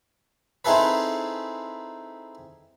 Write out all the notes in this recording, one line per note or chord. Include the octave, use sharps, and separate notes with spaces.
C4 D#4 E4 G#4 A4 B4